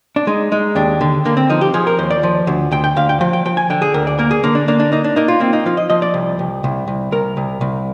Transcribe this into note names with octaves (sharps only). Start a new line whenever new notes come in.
D4
G#3 D#4
G#3 D#4
D#2 D4
D3
D3 A#3
C4
F3 D#4
G4
F3 G#4
A#4
D#2 C5
D5
F3
D2
D2 G5
G5
D2 F5
G5
F3 G5
G5
F3 G5
G#5
D3 G5
G#4
D2 A#4
D5
A#3 A#4
G#4
D3 A#3
D4
A#3 D4
D4
A#3 D#4
D4
A#3 D#4
F4
A#3 C4
D#4
F3 F4
D#5
F3 D#5
D5
C2
C2
C2
C2
C2 A#4
C2
C2